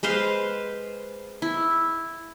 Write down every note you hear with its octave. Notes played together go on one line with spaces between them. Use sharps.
G#3 B4 C5 F5
E4